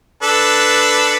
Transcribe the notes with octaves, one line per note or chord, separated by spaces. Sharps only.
D4 A4 B4